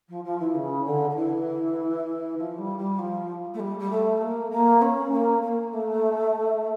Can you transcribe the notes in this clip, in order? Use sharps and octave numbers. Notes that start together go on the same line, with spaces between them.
F3
F3
E3
C#3
D3
D3
E3
F3
G3
G3
F3
A3
G3
G3
A3
A#3
A#3
C#4
A#3
A#3
A3